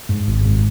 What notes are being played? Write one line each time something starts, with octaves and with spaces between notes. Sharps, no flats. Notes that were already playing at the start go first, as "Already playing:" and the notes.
G#2
G#1
G#2